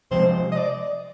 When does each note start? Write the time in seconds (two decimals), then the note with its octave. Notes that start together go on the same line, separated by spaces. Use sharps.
0.11 C3 F3 G#3 C5
0.52 D#5
0.56 D5